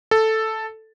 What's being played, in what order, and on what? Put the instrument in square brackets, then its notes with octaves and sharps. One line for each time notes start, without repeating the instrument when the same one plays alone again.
[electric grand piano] A4